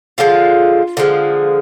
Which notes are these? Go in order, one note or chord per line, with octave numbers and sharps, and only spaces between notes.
D3 F3 G#3 F4
D3 F3 G#3